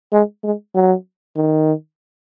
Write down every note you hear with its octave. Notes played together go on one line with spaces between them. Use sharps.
G#3
G#3
F#3
D#3